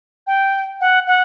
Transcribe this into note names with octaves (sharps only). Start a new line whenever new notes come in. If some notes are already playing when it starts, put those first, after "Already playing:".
G5
F#5
F#5